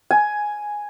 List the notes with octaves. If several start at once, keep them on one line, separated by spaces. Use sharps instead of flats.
G#5